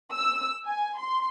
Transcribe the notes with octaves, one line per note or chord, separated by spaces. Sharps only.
E6
G#5
C6